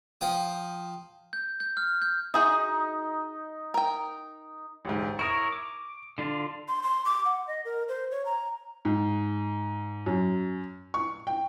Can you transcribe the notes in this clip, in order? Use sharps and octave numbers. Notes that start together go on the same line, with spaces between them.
F3 G5 D#6
G6
G6
F6
G6
D#4 F#4 G#4 E5 D#6 G6
A#4 G5
A1 D2 G#2
E4 A#4 C#5 C#6 D#6
D6
D3 D4 F4
C6
C6
D6
F#5
D#5
A#4
C5
C#5
A#5
G#2
F#2
C#6
G5